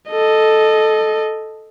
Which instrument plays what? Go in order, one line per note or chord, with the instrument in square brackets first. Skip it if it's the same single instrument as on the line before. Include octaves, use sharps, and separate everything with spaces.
[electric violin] A4 D#5